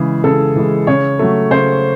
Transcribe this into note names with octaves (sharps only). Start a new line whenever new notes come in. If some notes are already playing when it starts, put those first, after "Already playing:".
Already playing: C#3 E3 G#3 G#4
C#3 A4
E3 G#3
C#3 C#5
F#3 A3
C#3 C5